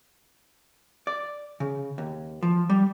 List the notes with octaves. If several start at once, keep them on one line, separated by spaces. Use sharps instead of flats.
D5
C#3
D#2
F3
G3